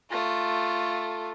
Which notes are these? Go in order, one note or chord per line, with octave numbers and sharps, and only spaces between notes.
A3 F4